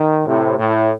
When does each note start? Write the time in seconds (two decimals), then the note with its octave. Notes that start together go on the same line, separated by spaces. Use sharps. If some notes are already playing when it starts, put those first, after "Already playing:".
Already playing: D#3
0.25 A2 C3
0.58 A2